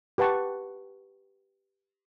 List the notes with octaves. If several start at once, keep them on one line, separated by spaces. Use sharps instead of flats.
G4 B4 F#5 A5 C#6